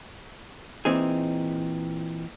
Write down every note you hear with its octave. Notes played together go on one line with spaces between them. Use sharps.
A#2 E3 C4 D#4 G#4